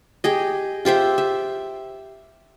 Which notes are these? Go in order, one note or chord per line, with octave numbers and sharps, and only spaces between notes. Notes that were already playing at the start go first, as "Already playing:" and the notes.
G4 G#4 D#5
F4 G4 C5 E5
E5